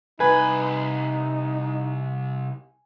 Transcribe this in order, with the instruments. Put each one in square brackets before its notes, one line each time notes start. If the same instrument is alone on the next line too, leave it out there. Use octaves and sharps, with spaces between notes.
[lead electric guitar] C2 B5 [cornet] D#4 [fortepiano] B4 [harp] G#5